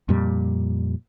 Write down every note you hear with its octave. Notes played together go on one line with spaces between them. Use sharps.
F2 A#2 G3